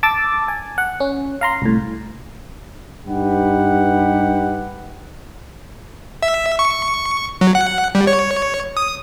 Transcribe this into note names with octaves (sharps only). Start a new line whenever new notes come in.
A5 D6 E6 A6
G#5
F#5
C#4
F5 A#5 C6
C2 A2
G2 D#4 G4 B4 F#5
E5
C#6
F#3
F#5
G3
C#5
D#6